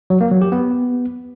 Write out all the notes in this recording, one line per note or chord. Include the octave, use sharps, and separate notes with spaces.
F#3
A#3
F#3
G4
B3